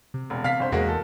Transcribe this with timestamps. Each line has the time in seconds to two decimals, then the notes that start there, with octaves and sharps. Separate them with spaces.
0.14 C3
0.30 E1
0.44 C3 F5 F6 B6
0.60 G1 C5
0.72 E2 G#3 A#3 F#4
0.89 A4